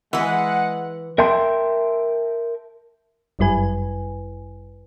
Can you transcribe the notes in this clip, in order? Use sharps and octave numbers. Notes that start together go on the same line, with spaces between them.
E3 G#3 B4 F#5
A#4 E5 G5 A5 C6
G1 F#2 G3 E4 B4 G#5